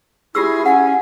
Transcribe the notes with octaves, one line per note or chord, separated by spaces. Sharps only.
E4 F4 G4 G#4 E6
C#4 F#5 G#5